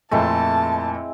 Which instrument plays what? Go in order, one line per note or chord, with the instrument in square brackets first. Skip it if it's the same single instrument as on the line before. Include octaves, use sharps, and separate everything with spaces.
[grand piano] F2 A#2 A3 [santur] G#3 C4 E4 [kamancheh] A5